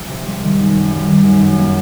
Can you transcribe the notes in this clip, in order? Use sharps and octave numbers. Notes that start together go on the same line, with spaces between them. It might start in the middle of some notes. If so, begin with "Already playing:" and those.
Already playing: F3 G#3
C3
G3
D#3
F#2
F#2
G3
D#3
F#2
F#2
A#3